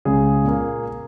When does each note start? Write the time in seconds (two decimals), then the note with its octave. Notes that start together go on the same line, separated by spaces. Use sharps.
0.05 C#2 C#3 G#3 G#4
0.44 A#2 A#3